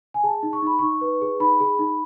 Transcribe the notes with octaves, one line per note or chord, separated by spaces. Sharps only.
G#5
G#4 A5
D#4
C#6
D#4 B5
D#4 C#6
B4
G#4
D#4 B5
G#4
D#4